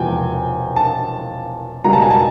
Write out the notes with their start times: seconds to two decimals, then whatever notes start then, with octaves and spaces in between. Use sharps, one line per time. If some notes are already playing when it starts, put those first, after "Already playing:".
Already playing: E1 E2 C3 F3 G5 G#5
0.76 A5
1.84 C#2 B2 G3 A#5
1.93 A5
2.02 G#5
2.10 A5